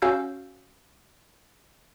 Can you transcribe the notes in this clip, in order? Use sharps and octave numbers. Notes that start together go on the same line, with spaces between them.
C#4 F#4 F5 E6 G6